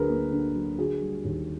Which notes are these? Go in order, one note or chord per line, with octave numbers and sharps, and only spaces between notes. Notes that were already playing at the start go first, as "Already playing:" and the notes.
Already playing: D2 D3 F#3 G#4 A#4 B4
A#3
D3
F#3
D3 F#4 G#4
G3
D#2